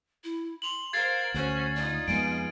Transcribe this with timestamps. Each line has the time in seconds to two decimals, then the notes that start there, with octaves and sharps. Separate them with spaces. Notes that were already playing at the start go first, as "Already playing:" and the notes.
0.24 E4
0.62 C6 F7 F#7
0.93 A#4 C5 F5 G#6 A6 C7
1.34 D2 C#4 F#4 C5
1.75 D#4 F4 D5
2.08 F2 G#3 B3 G#5 D7